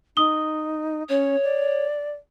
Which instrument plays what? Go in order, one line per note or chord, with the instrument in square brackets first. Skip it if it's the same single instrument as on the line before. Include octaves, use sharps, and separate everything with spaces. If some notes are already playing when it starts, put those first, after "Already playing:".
[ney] D#4 [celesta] D#6 G7
[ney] C#4 [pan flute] C#5
[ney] D5